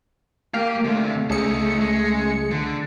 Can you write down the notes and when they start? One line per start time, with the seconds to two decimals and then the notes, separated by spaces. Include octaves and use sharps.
0.54 A#3 G4 F5
0.84 D2 C3 A3
1.30 C#2 D#4 G#4 A4 C#7
1.80 G#3
2.51 D3